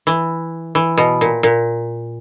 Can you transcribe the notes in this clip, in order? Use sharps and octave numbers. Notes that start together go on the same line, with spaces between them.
E3
E3
B2
A#2
A#2